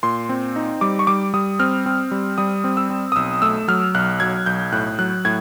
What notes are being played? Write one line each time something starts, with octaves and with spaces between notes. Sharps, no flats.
A#2 C6
C4
D#4
G3 D6
C#6
G3 D6
G3 D#6
C4 F6
C4
G3
G3 D#6
C4
E6
C4
D#6
B1 E6
A3 E6
F#3 F6
B1 F#6
F#3 G#6
B1 G6
A2 F#6
F#3 F#6
A2 G#6